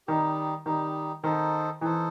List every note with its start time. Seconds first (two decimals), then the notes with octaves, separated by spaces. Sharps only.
0.07 D#3 G3 D#4 G4
0.66 D#3 G3 D#4 G4
1.23 D#3 D#4 A4 C5
1.81 E3 D#4 A4 C5